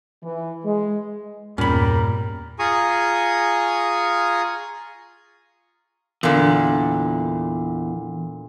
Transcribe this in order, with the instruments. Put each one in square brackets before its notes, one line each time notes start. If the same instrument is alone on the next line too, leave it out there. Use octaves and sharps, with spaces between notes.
[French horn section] E3
G#3
[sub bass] E2 [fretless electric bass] G2 A#2 [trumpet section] G3 A#4 [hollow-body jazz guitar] C#4 B5
[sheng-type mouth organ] F4 G#4 G#5 A#5 C#6 D#6
[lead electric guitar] E2 [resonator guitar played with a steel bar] A#2 D3